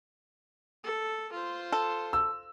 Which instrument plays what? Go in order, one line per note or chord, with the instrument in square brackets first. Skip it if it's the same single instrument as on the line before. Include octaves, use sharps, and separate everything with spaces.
[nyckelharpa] A4
F4 C5
[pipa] A4
[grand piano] E6